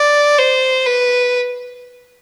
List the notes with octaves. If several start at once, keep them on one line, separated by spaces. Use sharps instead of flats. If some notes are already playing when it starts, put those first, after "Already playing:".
Already playing: D5
C5
B4